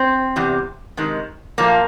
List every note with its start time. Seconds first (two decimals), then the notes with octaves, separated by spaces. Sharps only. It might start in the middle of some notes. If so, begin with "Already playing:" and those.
Already playing: C4
0.36 E2 C3 G3
0.97 C3 D#3 G#3
1.58 A#2 F3 A3 A#3